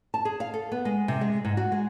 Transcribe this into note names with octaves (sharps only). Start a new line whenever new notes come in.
A5
G#4
F5
A4
B3
G#3
C3
G#3
G#2
F#4
G#3